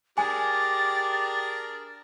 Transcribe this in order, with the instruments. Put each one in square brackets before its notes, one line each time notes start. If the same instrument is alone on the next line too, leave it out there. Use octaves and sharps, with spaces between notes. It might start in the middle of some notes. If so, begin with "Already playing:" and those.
[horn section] D4 G#4 A#4 [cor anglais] G4 [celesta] G#5 [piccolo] A6